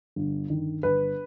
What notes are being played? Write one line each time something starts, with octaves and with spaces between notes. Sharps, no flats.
G1
G2 D#3
G1 B4